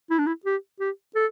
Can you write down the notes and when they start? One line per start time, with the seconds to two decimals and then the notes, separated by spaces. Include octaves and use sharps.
0.10 E4
0.19 D4
0.27 E4
0.46 G4
0.80 G4
1.16 A4